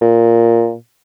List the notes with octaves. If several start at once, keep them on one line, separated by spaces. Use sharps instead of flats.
A#2